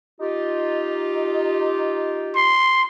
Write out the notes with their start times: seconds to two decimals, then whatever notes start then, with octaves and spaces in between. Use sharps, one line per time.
0.20 D#4 F4 G4
2.36 C6